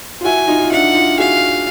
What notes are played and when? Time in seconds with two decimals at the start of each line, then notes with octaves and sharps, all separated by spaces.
0.21 F4
0.24 E4 F#4 G#5
0.47 D#4 F4
0.61 F4
0.71 D4 E4 F#5
0.94 D#4 F4
1.18 F#4 G#4 F5